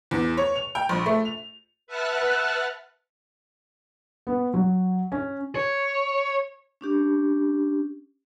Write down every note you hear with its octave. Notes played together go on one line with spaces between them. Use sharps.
E2
C#5
F7
G5
A#1
A3
F7
B4 E5 F#5 A5 F6 F#6
B3
F#3
C#4
C#5
C#4 D4 G4